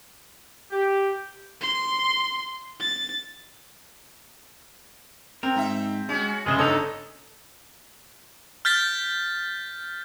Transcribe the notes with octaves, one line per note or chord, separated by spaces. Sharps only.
G4
C6
A6
C4 A#4
G#2 D#4 E5
G#3 C#4 F#4
F1 C#3 G#3 G#4 D#5 E5
G1 D4 D#4 A4 C#5 D#5 A#5
F6 G6 A6 B6